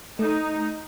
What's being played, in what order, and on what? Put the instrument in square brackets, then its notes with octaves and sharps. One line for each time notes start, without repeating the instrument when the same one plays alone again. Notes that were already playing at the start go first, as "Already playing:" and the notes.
[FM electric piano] A3 [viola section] D#4